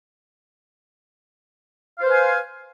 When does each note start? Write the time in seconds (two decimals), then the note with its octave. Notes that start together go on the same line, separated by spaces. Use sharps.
1.98 F5
2.02 C5
2.06 B4
2.09 G#5